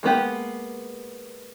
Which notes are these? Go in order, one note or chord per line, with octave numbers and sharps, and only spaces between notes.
G#3 A#3 B3 G4